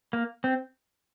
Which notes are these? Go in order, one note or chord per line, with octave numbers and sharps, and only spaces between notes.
A#3
C4